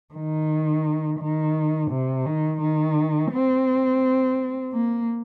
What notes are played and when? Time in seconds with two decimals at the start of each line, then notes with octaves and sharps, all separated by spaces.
0.15 D#3
1.20 D#3
1.91 C3
2.26 D#3
2.61 D#3
3.32 C4
4.73 A#3